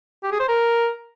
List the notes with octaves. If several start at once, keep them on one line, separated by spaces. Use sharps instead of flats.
G4
G#4
C5
A#4